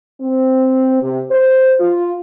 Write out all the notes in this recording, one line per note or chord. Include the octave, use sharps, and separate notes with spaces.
C4
C3
C5
F4